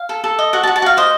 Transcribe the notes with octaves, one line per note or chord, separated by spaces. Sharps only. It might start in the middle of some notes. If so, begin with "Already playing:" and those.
Already playing: F5
A4
A4
D#5
F#4 F#5
A5
F#4
A5
F#4 F5
C5 D#5